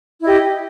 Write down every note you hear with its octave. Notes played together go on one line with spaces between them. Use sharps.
E4 G4 D#5